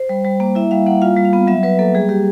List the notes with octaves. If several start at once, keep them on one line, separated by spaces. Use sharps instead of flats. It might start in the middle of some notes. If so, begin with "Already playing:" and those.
Already playing: C5
G3
G3
A#3
E4 E5
G3 F5
A#3 F#5
F4 F5
G3
F5
B3
F#3 E5
F#3 B4
A#3 A4
G3 G#4
G3 G4